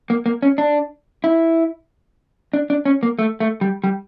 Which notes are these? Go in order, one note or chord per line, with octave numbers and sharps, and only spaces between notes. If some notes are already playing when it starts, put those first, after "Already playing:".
A#3
A#3
C#4
D4
E4
D4
D4
C#4
A#3
A3
A3
G3
G3